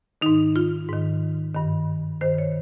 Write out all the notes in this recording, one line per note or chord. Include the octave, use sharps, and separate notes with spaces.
G#2 D#3 D#4
F4
G#2 D#3
G2 D#3
G2 D#3 C5
C#5